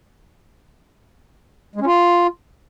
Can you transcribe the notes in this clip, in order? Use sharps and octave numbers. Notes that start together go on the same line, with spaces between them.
G#3
C#4
F4